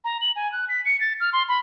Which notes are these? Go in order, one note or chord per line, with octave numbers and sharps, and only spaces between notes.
A#5
F#7
G#5
F#6
B6
C#7
A6
F6
C6
B5